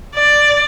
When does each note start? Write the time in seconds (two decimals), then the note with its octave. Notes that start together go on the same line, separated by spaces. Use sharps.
0.15 D5